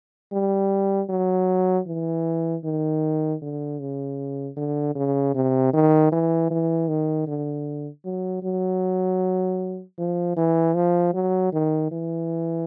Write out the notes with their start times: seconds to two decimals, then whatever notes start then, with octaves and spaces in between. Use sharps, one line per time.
0.32 G3
1.10 F#3
1.87 E3
2.65 D#3
3.42 D3
3.80 C#3
4.57 D3
4.95 C#3
5.35 C3
5.73 D#3
6.12 E3
6.51 E3
6.88 D#3
7.27 D3
8.05 F#3
8.43 F#3
9.98 F3
10.37 E3
10.75 F3
11.14 F#3
11.53 D#3
11.91 E3